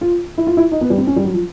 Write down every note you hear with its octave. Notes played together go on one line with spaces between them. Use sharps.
F4
E4
F4
E4
D#4
B3
G3
C4
C#4
G3
F#3
F3